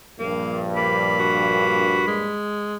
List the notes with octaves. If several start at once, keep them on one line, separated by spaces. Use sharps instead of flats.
A#1 G2 A#3
A#3 D5 B5
F#4
G#3